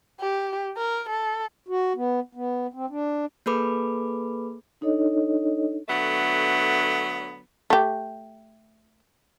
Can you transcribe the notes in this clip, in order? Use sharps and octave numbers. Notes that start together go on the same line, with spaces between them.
G4
A#4
A4
F#4
B3
B3
C4
D4
A#3 G#4 A4 B4 B5 D6
D4 D#4 A4 C#5 D#5
D3 F#3 A3 B3
A3 G4